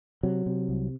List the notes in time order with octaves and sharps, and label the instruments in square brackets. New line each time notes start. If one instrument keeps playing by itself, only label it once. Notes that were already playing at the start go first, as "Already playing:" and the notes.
[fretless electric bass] C3 F#3
C3
C2